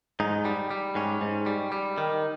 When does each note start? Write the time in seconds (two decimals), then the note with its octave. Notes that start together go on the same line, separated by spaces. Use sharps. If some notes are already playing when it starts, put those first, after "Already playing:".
0.20 G#2 D#4
0.45 G3
0.71 G3
0.95 G#2 C#4
1.21 G#2
1.46 G3
1.72 G3
1.98 D#3